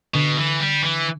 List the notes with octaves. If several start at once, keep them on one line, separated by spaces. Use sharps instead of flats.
B2 D3
E3
G3
E3